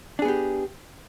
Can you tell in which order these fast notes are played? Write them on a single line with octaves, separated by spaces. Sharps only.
D4 G#4 B3 G4